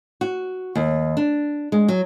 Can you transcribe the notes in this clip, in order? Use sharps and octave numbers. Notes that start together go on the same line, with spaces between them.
F#4
D#2
D4
G#3
F#3